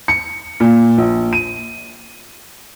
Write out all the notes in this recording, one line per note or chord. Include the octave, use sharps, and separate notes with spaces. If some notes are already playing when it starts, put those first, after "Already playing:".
C#7
A#2
A#1
D#7